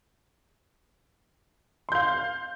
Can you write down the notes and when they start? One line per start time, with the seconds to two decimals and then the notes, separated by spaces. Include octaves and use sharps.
1.89 C6
1.92 G6
1.95 F5